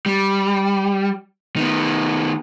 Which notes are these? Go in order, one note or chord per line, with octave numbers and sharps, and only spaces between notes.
G3
D#3 B3